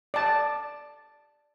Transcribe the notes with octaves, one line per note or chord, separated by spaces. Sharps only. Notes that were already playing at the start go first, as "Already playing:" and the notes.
D5 A5